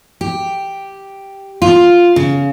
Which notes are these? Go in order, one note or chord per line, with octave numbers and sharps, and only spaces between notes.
G4
F4
C#3